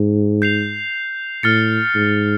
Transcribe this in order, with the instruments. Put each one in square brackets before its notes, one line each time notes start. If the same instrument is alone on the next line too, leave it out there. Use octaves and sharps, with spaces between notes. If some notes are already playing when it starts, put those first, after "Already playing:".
Already playing: [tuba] G#2
[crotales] G6 C7 F7
[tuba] A2 [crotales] F6 A6 C#7
[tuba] G#2